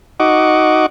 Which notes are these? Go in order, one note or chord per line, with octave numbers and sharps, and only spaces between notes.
D#4 F#4 D#5 F#5 C#6 D6